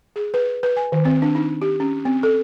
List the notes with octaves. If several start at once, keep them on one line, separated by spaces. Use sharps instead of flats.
G#4
B4
B4
G#5
D#3
C4
D4
D#4
G4
C#4
C4
A4